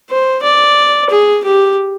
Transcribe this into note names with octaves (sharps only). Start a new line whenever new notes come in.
C5
D5
G#4
G4